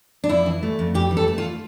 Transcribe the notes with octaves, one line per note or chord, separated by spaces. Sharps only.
D4
F2 E4
E3
A3
F2
F2 G4
E3
A4
A3
F4